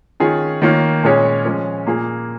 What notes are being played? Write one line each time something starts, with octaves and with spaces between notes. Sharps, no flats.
D#3 C#4 F4 G#4 C#5
D#3 A#3 F4 C#5
A#2 G#3 C#4 G#4 C#5
F3 G#3 C#4
A#2 A#3 F4 G#4